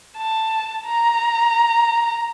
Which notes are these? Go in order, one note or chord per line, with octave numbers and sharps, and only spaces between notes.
A5
A#5